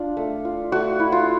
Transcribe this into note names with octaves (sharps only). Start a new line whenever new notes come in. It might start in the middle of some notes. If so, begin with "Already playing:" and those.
Already playing: D4 F4
A3
F4
A3 F#4
E4
F4